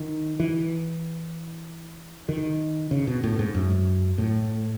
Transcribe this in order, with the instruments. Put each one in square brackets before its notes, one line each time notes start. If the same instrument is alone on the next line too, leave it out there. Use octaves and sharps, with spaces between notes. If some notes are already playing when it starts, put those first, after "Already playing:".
Already playing: [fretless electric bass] D#3
E3
D#3
C#3
B2
A2
G#2
F#2
A2